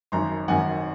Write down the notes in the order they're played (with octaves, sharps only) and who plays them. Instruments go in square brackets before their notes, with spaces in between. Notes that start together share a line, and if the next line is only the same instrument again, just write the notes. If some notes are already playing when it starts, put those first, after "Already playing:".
[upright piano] G#1 F#2 D#3 [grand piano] A#5 C6
[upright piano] G#1 F#2 D#3 [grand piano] F#5 G#5